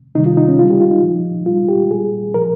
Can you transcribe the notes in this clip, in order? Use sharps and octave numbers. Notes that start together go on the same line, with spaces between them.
C3 D#3 G3 D#4
F4
D#4
C#4
C#3 G3 F4
G4
F4
D#4
A#2 F3
A#2 G3 F4
G4
A#2 G3 G#4
A#2 F3 A#4